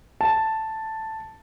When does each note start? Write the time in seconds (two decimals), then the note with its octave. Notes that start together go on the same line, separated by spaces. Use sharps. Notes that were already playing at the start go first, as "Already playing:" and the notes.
0.21 A5